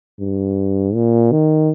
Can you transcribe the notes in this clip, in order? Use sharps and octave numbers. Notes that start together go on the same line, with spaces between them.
G2
A#2
D#3